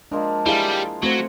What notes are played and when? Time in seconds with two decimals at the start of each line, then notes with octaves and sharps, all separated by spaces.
0.12 F3 G#3 A#3 D4
0.46 G3 E4 G#4 F5
1.03 F#3 A3 C4 C5